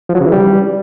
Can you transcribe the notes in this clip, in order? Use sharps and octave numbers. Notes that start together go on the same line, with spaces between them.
F3
F#3
C#3
E3
G3